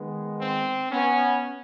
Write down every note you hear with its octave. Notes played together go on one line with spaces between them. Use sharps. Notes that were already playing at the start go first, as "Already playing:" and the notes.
Already playing: D#3 G#3 B3
C4
B3 C#4